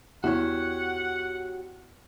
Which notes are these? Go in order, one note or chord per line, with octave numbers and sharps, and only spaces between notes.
E2 E3 F#4 G4 C#5 F#5